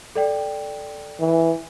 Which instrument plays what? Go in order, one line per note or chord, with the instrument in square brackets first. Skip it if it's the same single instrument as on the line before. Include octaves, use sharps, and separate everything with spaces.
[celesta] A4 D5 G5
[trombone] E3